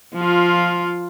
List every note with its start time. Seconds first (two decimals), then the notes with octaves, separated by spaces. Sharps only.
0.15 F3 F4